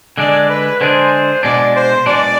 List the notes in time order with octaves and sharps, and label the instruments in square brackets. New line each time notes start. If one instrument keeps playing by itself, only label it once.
[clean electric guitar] D3 G#3 D4 G#4 [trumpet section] D5
[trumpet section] B4
[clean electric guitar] D3 G#3 D4 G#4 [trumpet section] C5
[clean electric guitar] B2 G#3 D4 [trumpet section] D5
[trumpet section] C5
[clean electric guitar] B2 G#3 D4 [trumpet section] D5